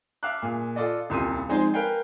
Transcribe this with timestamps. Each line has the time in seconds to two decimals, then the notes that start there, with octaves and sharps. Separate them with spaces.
0.23 E5 F5 A5 D6 F#6
0.42 A#2 G#4
0.76 F4 A4 D5 D#5
1.10 D#1 C2 F4 C6 D#7
1.48 F3 G#3 C4 D#4 G#4 C5
1.73 A#4 B4 F5 G5 G#5